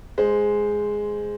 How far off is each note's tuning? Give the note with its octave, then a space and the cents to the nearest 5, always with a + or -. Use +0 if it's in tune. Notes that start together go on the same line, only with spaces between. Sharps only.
G#3 +0 C5 -5